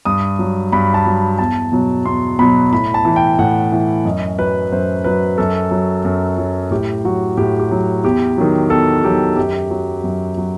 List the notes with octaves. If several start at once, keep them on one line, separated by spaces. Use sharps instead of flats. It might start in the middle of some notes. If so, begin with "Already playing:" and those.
G2 D#6
F#3
G2 B5
A5
F#3
E2 A5
B2 F#3
E2 C6
B2 F#3 B5
A2 B5
A5
E3
G5
A2 F#5
E3
F#2 D#5
F#3 B4
F#2 C5
F#3 B4
F#2 A4
F#3
F#2
F#3
A2 G4
F#3 F#4
A2 G4
G4
F#3
E2 G4
D#3 F#3
E2 A4
D#3 F#3 G4
F#2 G4
F#3
F#2
F#3